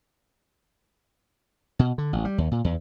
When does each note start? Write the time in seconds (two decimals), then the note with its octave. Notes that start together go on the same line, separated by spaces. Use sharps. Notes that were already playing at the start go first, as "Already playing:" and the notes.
1.79 B2
1.98 D3
2.13 A1
2.25 G3
2.38 D#2
2.51 A#2
2.64 E2